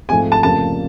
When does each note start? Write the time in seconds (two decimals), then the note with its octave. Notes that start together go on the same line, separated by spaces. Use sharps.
0.09 G#2 F3 A3 C4 G#5
0.32 A5
0.43 F1 F2 C#3 F3 A#3 A5